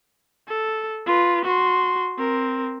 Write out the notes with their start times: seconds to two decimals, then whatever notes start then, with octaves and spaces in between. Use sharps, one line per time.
0.48 A4
1.06 F4 B4
1.45 F#4 C6
2.18 C4 A#4